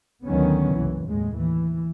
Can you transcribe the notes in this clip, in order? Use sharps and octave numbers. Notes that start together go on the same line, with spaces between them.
D2 D3 D#3 F#3 B3 C#4
F#1 C2 E3
D#2 A2 G#3
E3